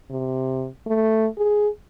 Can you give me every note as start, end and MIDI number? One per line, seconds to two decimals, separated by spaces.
0.10 0.67 48
0.86 1.26 57
1.37 1.68 68